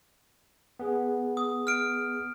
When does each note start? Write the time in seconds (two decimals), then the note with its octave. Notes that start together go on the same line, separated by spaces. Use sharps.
0.79 B3 G#4
1.37 D#6
1.67 F6 D7